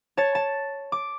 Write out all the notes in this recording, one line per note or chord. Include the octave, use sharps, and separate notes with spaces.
C#5 A5 A6
A5
D6